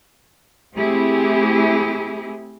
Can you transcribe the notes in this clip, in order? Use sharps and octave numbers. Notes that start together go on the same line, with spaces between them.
A3 C4 E4 G4 G#4